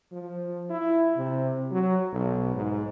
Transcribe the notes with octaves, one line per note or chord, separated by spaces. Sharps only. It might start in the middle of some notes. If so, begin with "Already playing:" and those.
F3
E4
C3
F#3
B1
G#2